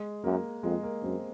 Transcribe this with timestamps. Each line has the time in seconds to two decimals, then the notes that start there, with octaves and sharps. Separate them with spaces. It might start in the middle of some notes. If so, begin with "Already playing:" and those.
Already playing: G#3
0.24 F#2 A#3
0.63 F2 G#3
0.83 A#3
1.03 F#2 C4